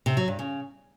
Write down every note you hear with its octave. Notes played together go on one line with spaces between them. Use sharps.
C3
F#3
G2
C#3